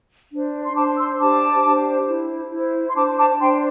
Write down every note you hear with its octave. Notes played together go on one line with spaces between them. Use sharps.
D4 C5
C6
D4 C5 A5 D6
C6 E6
D4 G4 C5 A5 D6
D4 G4 C5
E4 C5
E4 C5
C6
D4 C5 A5 D6
A5 D6
D4 C5 G5 C6